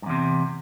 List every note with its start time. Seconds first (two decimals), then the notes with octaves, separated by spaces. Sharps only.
0.02 G2
0.06 E2
0.10 C3